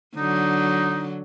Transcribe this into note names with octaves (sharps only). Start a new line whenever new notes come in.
D3 F#3 D#4